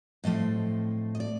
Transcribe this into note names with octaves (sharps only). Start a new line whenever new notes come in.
A2 F3 A3 C4 D#5
D#5
D5